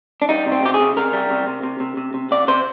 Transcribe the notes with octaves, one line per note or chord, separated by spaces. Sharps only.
D4
G3 D#4
C3
C4
C3 G4
G#4
C3
C3 A#4
G3
C3
C3
C3
C3
C3
C3
C3 D5
C3 C5